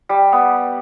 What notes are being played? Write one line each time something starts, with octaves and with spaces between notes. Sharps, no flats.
G3
B3